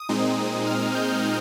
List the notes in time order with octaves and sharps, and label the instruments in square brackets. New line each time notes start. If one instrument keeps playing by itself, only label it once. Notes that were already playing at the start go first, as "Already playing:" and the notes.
Already playing: [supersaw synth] D#6
A#2 G#3 C4 D#4
F6
G6